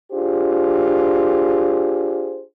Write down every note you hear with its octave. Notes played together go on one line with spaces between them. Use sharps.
D4 F4 G4 G#4 C5